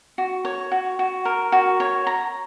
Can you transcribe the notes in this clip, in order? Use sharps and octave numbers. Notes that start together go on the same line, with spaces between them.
F#4
C#5
F#4
F#4
A#4
F#4
C#5
A#5